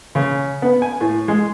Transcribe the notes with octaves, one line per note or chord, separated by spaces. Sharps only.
C#3
B3
G#5
A2
G#3